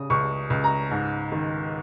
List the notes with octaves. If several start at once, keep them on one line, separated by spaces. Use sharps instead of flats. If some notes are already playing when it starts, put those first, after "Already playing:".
Already playing: C#3 D#6
C#2 C#6
C#2
A#5
G#2
D#3